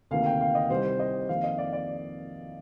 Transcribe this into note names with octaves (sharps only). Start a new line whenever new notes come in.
D2 C3 D#3 A#3 F5
G5
F5
D#5
C2 C3 D#3 G3 C5
D#5
F2 D#3 A#3 F5
D#5
D5
D5